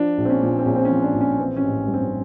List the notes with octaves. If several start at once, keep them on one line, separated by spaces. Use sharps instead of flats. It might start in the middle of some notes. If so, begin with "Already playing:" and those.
Already playing: F3 D4
A#1
C4
C#4
A#2
C4
A#1 C#4
C4
F3 C#4
D4
A#1
C#4
E3 C4
C#4
A1
G2
C4